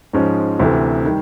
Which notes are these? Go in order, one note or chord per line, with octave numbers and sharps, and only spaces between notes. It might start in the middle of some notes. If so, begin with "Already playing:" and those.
G#2 F3 G#3 C#4
D2 C3 E3 A3
D#3 G3